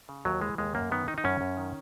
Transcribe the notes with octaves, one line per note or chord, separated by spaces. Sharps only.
C#3
D#2 F#3
E3 G#3
D#2 G#3
F#2 A#3
D#3 B3
D#3 D#4
D#4
F#2 C#4
F#2
D#3